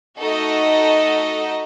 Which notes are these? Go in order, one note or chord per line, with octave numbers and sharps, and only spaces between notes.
A3 D#4 F#4 A4 D#5